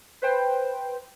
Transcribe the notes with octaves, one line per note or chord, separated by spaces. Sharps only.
B4 C5 G5